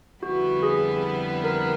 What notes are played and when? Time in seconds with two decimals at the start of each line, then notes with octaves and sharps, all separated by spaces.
0.22 F2 D3 G3 B3 E4 F#4
0.63 G#4
1.44 A#4